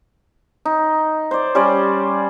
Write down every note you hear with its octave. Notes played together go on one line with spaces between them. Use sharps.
D#4
C5 D5
G3 C#4 C5 D5